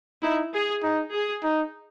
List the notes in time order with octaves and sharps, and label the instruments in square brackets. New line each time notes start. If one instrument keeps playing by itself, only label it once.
[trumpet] D#4 [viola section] E4
[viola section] G#4
[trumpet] D#4
[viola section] G#4
[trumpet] D#4